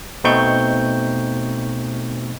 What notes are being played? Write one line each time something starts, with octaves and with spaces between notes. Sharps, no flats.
B2 A3 C4 D#4 C#6 G6